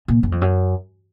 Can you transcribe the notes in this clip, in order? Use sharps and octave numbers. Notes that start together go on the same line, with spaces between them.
A#2
F#2
F2
F#2